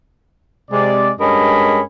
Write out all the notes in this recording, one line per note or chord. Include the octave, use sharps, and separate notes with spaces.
C3 G#3 D5
G2 G#3 C#4 A#4 D#5 B5